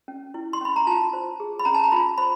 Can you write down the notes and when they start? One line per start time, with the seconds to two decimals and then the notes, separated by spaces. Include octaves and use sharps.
0.08 C#4
0.34 E4
0.53 C6
0.61 C#4 B5
0.76 A#5
0.87 F4 A5
1.13 C5
1.40 G#4
1.59 B5
1.65 C#4 A#5
1.75 A5
1.84 A#5
1.92 F4 B5
2.18 C5 B5